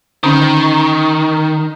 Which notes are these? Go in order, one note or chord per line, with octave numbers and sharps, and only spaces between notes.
D3 D#3 C#4